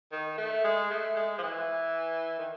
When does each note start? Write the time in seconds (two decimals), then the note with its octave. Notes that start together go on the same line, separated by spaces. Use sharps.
0.12 D#3
0.38 A3
0.64 G#3
0.91 A3
1.16 G#3
1.38 F3
1.43 E3
2.39 D#3